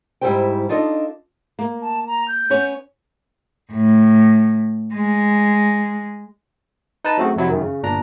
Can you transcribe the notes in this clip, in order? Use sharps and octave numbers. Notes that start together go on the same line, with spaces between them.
G#2 G3 E4 G4 C5 G5
D4 D#4 F4 A4 D#5
A#3
A5
A#5
G6
B3 C#4 C#5
A2
G#3
D#4 B4 A5
F#3 A3 C4 C#4 F#4 G#4
F2 C3 F#3 E4
F#2 D#3
C#3
G1 A#2 D4 A#5